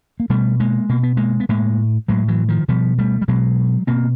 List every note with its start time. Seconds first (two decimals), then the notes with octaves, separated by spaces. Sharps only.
0.20 A#3
0.30 B2 G3 A3
0.60 G#3 A#3
0.89 B2 A#3
1.03 B3
1.17 G#3 A#3
1.40 B3
1.49 A2 G#3 A#3
2.08 A2 F#3 G#3
2.28 E3 F#3
2.49 D#3 F3
2.68 B2 F3 G3
2.98 G3 A3
3.21 G3
3.28 B2 F#3 G#3
3.87 B2 A#3 C4